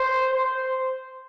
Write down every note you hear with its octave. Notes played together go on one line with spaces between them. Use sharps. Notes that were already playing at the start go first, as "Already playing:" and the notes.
Already playing: C5
C5